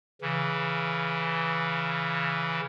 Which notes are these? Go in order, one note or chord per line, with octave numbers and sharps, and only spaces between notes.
C#3 E3